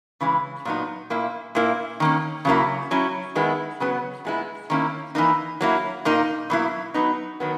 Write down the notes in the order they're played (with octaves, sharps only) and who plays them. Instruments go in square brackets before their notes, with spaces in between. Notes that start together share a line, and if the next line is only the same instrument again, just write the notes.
[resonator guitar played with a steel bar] C#3 E3 G#3
A#2 F#3 B3 D#4
A#2 A#3 E4
A#2 A#3 E4
D#3 A#3 C#4
C#3 F#3 A#3 E4
F#3 C#4 E4
D#3 G#3 B3 E4
C#3 F#3 B3
A#2 G#3 B3 E4
D#3 A#3 C#4 E4
E3 A#3 D#4
F#3 A#3 E4
A#2 A#3 D#4
B2 F#3 A#3 E4
F#3 B3 D#4
D#3 F#3 B3